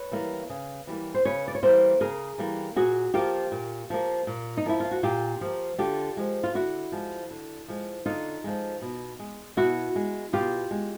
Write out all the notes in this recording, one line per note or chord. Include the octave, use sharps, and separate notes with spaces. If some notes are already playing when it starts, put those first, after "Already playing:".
Already playing: B4 C#5
E3 G3 A#3
C#3
E3 G3 A#3
C5
C#3 B4 C#5
D5
C#5
E3 G3 A#3 A#4 C5
C#3 G#4 A#4
E3 G3 A#3
A#2 F#4 G#4
F3 A#3 F4 G4
A#2
F3 A#3
A#2
D#4
F3 A#3 E4
F4
F#4
A#2 F4 G4
F3 A#3
D3 F4 G4
F3 G#3
F4
D3 E4 F#4
F3 G#3
D3
F3 G#3
D3 D#4 F4
F3 G#3
B2
G#3
B2 E4 F#4
G#3
B2 F4 G4
G#3